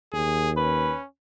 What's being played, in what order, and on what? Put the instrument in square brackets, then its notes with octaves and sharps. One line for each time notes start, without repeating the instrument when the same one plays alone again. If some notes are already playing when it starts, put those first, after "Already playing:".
[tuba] D#2 [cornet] G#4
[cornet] C#4 [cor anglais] B4